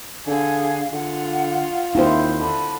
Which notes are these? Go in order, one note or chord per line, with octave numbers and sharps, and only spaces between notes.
D3 G#4 F5
D3 F4 F#5
D#2 E4 C5
D3 B5